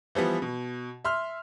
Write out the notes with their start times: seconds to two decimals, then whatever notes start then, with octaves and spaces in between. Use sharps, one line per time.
0.15 E3 F3 G3 B3
0.42 B2
1.05 E5 C6 F6